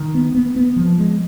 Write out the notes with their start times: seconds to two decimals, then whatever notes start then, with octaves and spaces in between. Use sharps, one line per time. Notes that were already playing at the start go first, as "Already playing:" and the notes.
Already playing: D#3
0.15 B3
0.35 B3
0.56 B3
0.76 F3
0.98 G#3